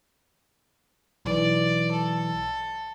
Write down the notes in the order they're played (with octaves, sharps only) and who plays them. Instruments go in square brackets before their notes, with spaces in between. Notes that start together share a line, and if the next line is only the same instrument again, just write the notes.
[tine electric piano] B1 E3 [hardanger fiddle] D5
[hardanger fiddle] A4